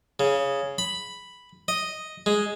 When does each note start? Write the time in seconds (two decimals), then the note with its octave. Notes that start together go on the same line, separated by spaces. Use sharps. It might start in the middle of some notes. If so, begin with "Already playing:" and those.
0.20 C#3
0.78 B5
1.68 D#5
2.26 G#3